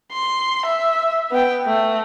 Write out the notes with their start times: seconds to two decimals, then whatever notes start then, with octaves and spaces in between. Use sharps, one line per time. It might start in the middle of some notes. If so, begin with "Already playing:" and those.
0.12 C6
0.66 E5
1.31 B3 G5
1.67 A3